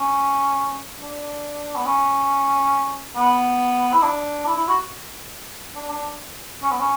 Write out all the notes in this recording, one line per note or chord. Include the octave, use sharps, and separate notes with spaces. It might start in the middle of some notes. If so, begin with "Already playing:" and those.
Already playing: C#4
D4
B3
C#4
B3
E4
D4
E4
E4
F#4
D4
D4
C#4
B3
C#4